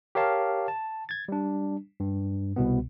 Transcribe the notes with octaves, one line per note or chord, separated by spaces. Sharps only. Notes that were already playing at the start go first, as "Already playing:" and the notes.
G4 A#4 C#5 F5 A5
A5
G#6 A6
G3 D4
G2
C2 B2 B3